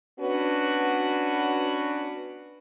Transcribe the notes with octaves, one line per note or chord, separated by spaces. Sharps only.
B3 C#4 D4 F#4 B4